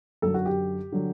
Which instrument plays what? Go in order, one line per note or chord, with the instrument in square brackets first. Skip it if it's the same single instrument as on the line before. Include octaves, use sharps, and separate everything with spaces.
[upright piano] F#2 D3 F#3 A4
F#4
G4
D3 F#3